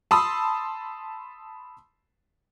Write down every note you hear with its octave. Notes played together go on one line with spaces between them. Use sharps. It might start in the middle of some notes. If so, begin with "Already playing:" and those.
A5 B5 C6 D#6 E6